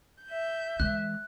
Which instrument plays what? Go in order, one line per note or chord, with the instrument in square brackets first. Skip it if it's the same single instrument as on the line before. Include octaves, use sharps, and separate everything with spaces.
[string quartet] E5 G6
[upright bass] E3 G#3 [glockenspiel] F#6